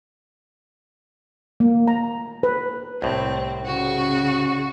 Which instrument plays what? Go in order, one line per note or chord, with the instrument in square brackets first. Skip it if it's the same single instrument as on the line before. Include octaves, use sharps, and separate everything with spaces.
[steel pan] A#3
A#5
B4
[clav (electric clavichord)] C2 A2 [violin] C4
[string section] C#3 C#6 [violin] F#4